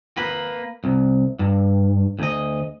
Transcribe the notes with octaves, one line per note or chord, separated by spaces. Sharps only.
A#3 B4
C2
G2
D2 D#5